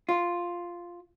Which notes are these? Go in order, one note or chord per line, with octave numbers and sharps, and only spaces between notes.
F4